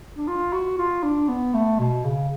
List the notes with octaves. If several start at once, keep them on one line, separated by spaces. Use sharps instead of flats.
D4
F4
F#4
F4
D4
B3
A3
B2
C#3